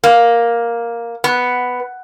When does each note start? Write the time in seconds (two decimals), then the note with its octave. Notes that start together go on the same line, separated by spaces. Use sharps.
0.04 A#3
1.24 B3